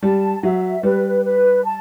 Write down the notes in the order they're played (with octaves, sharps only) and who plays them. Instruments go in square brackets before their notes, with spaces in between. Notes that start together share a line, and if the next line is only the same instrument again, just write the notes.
[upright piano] G3 [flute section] A5
[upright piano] F#3 [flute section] E5
[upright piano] G3 [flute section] B4
[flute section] B4
A5